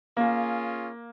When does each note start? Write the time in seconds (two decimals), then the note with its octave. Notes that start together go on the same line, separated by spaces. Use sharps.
0.17 A#3 C#4 F4 G#4